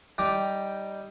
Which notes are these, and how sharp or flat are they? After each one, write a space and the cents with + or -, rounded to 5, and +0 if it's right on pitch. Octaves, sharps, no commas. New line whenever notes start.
G3 +0 D#4 +10 D6 +0